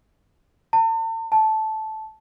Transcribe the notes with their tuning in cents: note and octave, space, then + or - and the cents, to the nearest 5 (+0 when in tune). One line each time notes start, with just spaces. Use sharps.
A5 +40
A5 -10